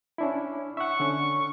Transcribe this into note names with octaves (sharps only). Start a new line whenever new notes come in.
C#4 D4 E4
E5 F#5 C#6
D3 C#4